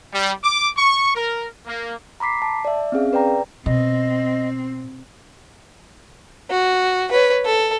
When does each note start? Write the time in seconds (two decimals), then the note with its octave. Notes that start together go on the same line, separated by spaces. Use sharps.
0.13 G3
0.43 D6
0.76 C#6
1.15 A#4
1.67 A#3
2.20 A#5 B5 D6 B6 C7
2.42 A5
2.65 D5 E5
2.92 C4 C#4 G#4 F5
3.13 B4 D5 G5 A#5
3.66 B2 C4 D#5
6.50 F#4
7.12 B4 C#5
7.46 A4